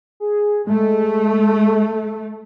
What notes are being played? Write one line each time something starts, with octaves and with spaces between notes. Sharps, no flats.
G#4
G#3 A3